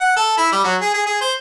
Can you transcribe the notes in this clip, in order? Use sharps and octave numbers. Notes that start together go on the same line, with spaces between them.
F#5
A4
E4
G3
F#3
G#4
G#4
G#4
C5